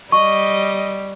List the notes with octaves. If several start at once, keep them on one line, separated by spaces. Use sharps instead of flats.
G3 D#5 C#6